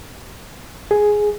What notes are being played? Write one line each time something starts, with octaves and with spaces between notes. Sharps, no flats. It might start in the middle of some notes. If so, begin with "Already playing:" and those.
G#4